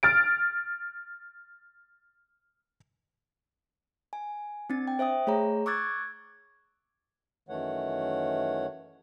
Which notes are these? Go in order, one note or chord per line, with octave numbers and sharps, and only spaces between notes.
F6 A6 D7
G#5
C4 D4 A6
G5
C5 E5 G5 D#6
A3 G#4 C#5 A#5
C#6 D6 E6 F#6 G#6 A6
F#2 D#3 E3 A3 C#5 F#5